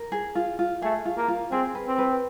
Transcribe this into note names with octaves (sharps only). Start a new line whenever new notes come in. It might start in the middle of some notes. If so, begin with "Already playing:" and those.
Already playing: A#4
G#4
F4
F4
A3 G#4
F4
A#3
F4
C4 G#4
B4
C4
B4